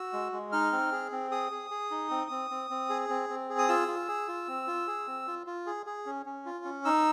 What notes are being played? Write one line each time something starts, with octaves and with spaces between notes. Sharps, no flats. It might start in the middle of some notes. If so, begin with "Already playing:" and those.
Already playing: F#4 E6
G#3
G#3
D#4 F6
C4
G#4
C4
G#4 D#6
G#4
G#4
D#4
C4
C4
C4
C4
G#4
C4
C4
G#4
D#6
F4 E6
F4
G#4
F4
C4
F4
G#4
C4
F4
F4
G#4
G#4
C#4
C#4
F4
C#4
D#4 E6